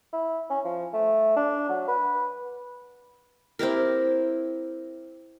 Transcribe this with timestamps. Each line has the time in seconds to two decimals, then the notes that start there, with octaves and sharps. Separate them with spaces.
0.13 E4
0.50 C#4
0.65 F3
0.93 A3
1.36 D4
1.69 F#3
1.87 B4
3.59 C4 E4 G4 A#4